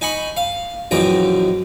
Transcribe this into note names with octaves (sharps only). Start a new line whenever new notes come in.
D#4 G#5 B5 C#6
F5
A#1 F#2 B2 E3 G5 A#5